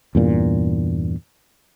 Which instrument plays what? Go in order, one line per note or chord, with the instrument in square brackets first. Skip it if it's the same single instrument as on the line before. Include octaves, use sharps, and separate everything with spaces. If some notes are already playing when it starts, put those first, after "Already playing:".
[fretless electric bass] E2 G2 A#2